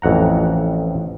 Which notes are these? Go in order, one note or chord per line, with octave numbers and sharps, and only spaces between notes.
A1 F2 F#5 A#5